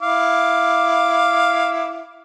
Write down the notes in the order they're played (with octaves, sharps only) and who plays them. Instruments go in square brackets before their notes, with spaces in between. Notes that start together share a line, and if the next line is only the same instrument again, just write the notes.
[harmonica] E4 F5 D6